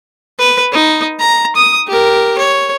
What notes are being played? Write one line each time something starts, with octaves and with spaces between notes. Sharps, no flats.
B4
D#4
A#5
D#6
G4 A#4
C#5